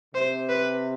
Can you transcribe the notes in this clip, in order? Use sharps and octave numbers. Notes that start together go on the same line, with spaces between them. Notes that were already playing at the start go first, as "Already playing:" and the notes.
C3 C5
B4